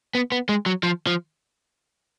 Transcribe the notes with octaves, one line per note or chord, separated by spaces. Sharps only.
B3
B3
G#3
F#3
F3
F3